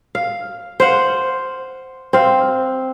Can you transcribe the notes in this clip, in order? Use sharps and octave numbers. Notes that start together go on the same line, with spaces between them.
F5
C5 F5 F#5
C4 F5